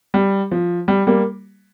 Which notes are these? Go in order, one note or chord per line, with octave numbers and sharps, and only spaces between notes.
G3
F3
G3
G3 A#3